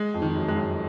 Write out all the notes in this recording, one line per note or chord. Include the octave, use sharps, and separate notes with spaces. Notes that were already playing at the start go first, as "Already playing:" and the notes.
Already playing: G#3
F2
D#3
F#2
G#3
F#2